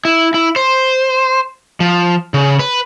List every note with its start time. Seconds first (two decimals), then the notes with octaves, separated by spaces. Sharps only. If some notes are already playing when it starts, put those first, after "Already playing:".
0.05 E4
0.34 E4
0.56 C5
1.80 F3
2.34 C#3
2.59 B4